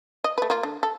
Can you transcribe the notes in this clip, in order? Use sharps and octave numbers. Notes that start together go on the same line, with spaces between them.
D#5
A3 B4
A#3 F4
D3
A4